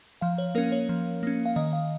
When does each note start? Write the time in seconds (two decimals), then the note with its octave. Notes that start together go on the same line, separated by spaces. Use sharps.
0.21 F3 F5
0.38 C#5
0.55 A#3 C#4 A#4
0.72 C#5
0.89 F3
1.23 A#3 C#4
1.46 F5
1.56 D#3 D#5
1.73 F5